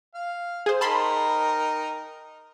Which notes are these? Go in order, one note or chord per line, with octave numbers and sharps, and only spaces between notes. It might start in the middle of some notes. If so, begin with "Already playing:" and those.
F5
G#4 C5
D#4 A#4 G5 A5 B5 C6